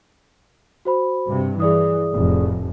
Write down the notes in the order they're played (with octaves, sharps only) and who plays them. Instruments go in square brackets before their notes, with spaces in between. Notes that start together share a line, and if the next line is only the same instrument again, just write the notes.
[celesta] F#4 C5 B5
[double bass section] G2 C3
[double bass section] E3 [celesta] G#4 D5 D#6
[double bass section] F1 A2